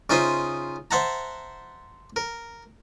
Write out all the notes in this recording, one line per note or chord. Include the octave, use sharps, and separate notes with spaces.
C#3 D#4 F4 C5 E5 D#6
C5 E5 F#5 A5 A#5
A#4